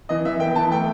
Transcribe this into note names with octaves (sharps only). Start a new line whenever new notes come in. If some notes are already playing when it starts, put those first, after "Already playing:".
E3 D#5
E3 E5
B3 G5
E3 A5
A3 G5